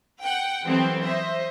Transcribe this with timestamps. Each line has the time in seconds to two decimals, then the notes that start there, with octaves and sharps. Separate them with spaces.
0.21 F#5 G5
0.64 E3 F#3 G3 B3 C4 A4
1.03 C5 D#5 E5